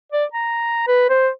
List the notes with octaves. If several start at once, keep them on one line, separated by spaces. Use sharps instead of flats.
D5
A#5
B4
C5